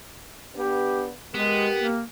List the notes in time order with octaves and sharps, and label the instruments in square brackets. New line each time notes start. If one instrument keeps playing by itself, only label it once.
[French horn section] B3 D4 [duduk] G4
[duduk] G#3 [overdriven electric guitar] B3 [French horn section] G4 A#4
[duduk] A#3